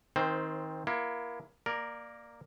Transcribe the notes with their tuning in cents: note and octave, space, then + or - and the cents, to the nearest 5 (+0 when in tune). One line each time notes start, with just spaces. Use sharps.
D#3 +25 C4 +15 C5 +0
A#3 +25 E4 +30
A#3 +0 A#4 +0 D5 +20